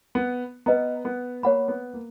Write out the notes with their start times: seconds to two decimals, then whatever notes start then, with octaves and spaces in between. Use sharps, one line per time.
0.15 B3
0.66 B3 B4 D#5 A#5
1.05 B3
1.43 A#3 C#5 F#5 B5
1.68 B3
1.93 A#3